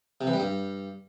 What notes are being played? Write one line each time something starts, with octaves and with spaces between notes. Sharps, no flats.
C3
E3
G3
G2